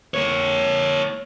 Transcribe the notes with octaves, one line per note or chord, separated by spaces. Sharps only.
A#3 C#5